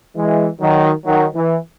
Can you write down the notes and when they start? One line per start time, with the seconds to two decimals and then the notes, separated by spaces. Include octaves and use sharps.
0.16 E3 G#3
0.61 D#3 F#3
1.05 D#3 F#3
1.35 E3